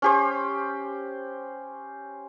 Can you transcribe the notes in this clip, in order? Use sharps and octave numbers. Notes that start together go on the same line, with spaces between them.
C#4 G4 C5